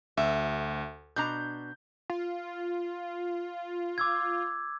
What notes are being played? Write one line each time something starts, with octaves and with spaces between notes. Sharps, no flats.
D2 E5
B2 D4 A#5 G6
F4
D6 E6 G#6